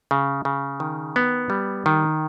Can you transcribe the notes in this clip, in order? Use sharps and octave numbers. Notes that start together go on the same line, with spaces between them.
C#3
C#3
D#3
B3
G3
D#3